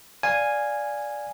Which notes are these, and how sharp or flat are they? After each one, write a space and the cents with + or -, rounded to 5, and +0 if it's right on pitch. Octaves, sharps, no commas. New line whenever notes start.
D5 -5 F5 +0 G#5 -5